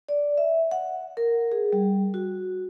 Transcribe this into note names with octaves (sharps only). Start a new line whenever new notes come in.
D5
E5
F#5
A#4
G#4
G3
F#4